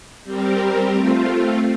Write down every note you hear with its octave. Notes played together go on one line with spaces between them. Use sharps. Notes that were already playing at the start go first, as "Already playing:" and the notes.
G3 C4 G4 A#4
A3 C4 F4